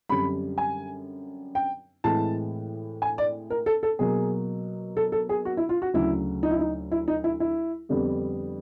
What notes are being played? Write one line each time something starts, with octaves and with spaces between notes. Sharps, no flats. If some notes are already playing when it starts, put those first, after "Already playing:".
F#2 D3 G3 C4 B5
G#5
G5
A2 E3 G#3 C4 A5
G#5
D5
A#4
A4
A4
B2 F#3 A#3 G#4
A4
A4
G#4
F#4
E4
F4
F#4
D2 C#3 F#3 E4
D#4
E4
D#4
E4
D#4
E4
E4
F2 D3 G3 B3